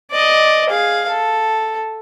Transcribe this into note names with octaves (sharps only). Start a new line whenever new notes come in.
D5 D#5
G#4 F5
A4